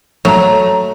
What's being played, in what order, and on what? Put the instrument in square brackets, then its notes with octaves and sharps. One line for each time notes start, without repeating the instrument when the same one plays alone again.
[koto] F#3 [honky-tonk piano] A3 A#5